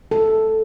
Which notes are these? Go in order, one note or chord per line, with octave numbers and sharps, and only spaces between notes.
A4